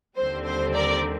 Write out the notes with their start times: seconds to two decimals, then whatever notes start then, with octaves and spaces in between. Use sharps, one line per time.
0.17 D#2 D3 G3 C4 C5
0.45 C5
0.74 A#4 D5